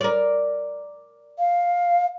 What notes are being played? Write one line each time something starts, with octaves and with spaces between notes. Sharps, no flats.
A#4 D5
F5